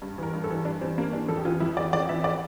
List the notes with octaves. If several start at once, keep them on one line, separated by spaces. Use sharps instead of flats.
G2
E3 A#4
G2
A4
E3
G2 D4
E3 C4
G2 A#3
E3 D4
F2 A4
G4
E3 F4
F2 E4
E3 D5
F2 D5
E3 E5
D5